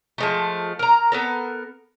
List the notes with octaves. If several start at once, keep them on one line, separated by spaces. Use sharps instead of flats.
F3 G#3 A3
A#4 A#5
B3 A4 A#4